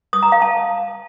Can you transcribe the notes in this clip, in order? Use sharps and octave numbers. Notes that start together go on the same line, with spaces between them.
D#6
A#5
F5
A5